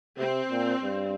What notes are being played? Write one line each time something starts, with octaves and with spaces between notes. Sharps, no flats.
C3 C4
A#2
G2